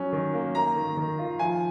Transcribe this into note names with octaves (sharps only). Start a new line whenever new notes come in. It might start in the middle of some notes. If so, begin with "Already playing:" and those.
Already playing: F#3 C#4
D#3
A#3
A#3 A#5
D#3
D#3
F4
F3 G#5